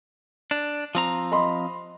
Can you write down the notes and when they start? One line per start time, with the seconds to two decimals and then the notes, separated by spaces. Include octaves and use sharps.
0.51 D4
0.95 F3 C4 A#5
1.32 D#5 B5 C6